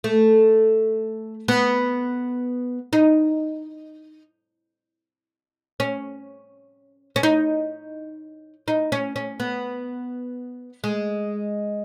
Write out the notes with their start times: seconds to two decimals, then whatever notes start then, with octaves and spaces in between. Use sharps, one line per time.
0.04 A3
1.48 B3
2.93 D#4
5.80 C#4
7.16 C#4
7.23 D#4
8.68 D#4
8.92 C#4
9.16 C#4
9.40 B3
10.84 G#3